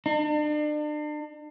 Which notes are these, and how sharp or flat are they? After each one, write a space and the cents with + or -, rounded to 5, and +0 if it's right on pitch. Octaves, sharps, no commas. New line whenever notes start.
D4 +40